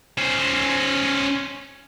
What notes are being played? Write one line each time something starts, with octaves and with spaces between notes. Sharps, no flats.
C#4 C5